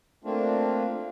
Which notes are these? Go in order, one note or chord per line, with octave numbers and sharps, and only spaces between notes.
A3 A#3 C4 D4 F4